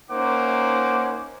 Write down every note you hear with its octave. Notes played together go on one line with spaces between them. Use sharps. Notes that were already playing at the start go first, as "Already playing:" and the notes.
A#3 C#4 D#4 C5 F#5 D6